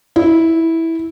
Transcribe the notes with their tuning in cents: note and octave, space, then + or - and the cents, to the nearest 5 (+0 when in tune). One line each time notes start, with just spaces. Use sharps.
E4 -10